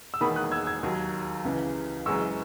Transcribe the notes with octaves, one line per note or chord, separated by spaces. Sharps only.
E6
E1 E2 D#3 A#3 B5 D#6
D#6 F#6
E6 G#6
E6 G#6
D#2 D#3 F#3
C#2 C#3 E3
F#1 F#2 E3 G#3 C#6 E6